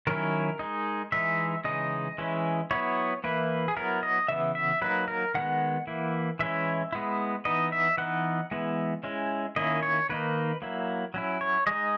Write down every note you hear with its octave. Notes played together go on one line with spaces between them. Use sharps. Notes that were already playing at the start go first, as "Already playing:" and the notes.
D#3 F#3 C#4 E4 A#4
G#3 D#4
E3 G#3 D#4 E5
C#3 E3 G#3 D#4 D#5
E3 G#3 C#4 E4
F#3 B3 E4 C#5
E3 A#3 E4 B4
G#4
F#3 B3 E4 A#4
D#5
C#3 E3 B3 E5
E5
F#3 A#3 D#4 B4
A#4
D#3 G#3 B3 F#5
E3 A#3 E4
E3 G#3 C#4 E4 E5
G#3 B3 E4
E3 B3 D#4 D#5
E5
E3 B3 D#4 F#5
E3 G#3 B3 E4
G#3 C#4 E4
D#3 A#3 C#4 E4 D#5
C#5
D#3 A#3 D#4 B4
F#3 A#3 E4
F#3 C#4 E4
C#5
G#3 D#4 D#5